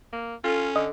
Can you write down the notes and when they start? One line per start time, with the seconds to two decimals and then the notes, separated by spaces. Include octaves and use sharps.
0.13 A#3
0.44 C#4 F4 A4
0.76 D3 D#5